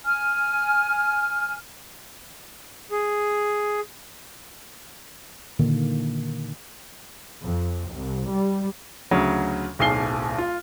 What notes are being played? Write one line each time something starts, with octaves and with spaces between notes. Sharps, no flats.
G#5 F6
G#4
A#2 D3 D#3 A#3
F2
C2
G3
D2 C#3 F#3
D1 B1 G#4 G#5 C7 G7
F4